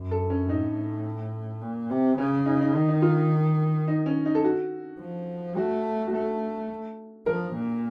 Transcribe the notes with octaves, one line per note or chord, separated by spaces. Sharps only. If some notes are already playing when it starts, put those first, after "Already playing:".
Already playing: F#2
A4
C#4
A2 D#4
A#2
C3
C#3 C#4
D#4
D#4
D#3 D#4
D#4
F4
D#4
D#4
C#4
D#4
A4
F#4
F3
A3 F#4
F#4
A3 A4
F3 A#4
A#2